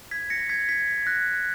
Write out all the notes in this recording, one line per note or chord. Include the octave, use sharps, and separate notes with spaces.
G#6 B6
A#6 C#7
G#6 B6
G#6 B6
F#6 A#6